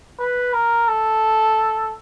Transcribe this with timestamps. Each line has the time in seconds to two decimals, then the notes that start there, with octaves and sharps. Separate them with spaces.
0.19 B4
0.54 A#4
0.88 A4